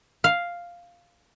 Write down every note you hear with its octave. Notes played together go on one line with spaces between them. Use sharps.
F5